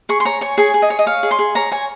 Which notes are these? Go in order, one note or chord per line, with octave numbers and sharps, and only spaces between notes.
G#4 C#6
C6
C#5 A#5
C#5 G#5
G#4 G#5
G#4
D#5
C#5
D#5
C#5 F5
G#4
C6
G#4
C#5 A#5
C#5 G#5